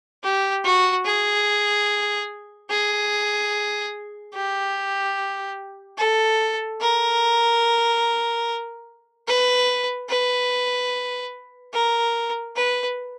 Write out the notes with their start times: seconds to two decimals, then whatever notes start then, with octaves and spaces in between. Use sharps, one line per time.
0.24 G4
0.64 F#4
1.05 G#4
2.70 G#4
4.35 G4
5.98 A4
6.81 A#4
9.28 B4
10.09 B4
11.73 A#4
12.56 B4